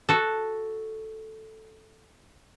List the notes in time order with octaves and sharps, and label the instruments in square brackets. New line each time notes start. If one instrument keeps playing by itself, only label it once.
[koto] F#4 A4